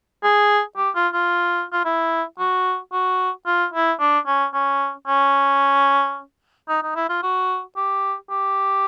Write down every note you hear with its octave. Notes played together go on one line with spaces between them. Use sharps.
G#4
G4
F4
F4
F4
E4
F#4
F#4
F4
E4
D4
C#4
C#4
C#4
D#4
D#4
E4
F4
F#4
G4
G4